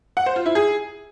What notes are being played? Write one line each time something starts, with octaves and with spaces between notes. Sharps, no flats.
F#5
C5
F4
E4
G#4